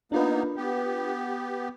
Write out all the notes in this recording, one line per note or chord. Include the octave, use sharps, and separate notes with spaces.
A#3 B3 D4 D#4 F4 B4
B3 G4